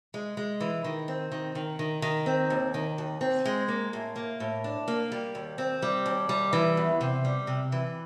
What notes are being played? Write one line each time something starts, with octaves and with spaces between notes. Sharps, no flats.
G#3
G#3
E3
D#3
C4
D#3
D#3
D#3
D#3
C4
D#2
D#3
D#2
C4
G#3
A#3
A2
A#3
A2
D4
A#3
G3
D#2
C4
G3
D#2
G3
E3
E2
C3
G3
C3
E3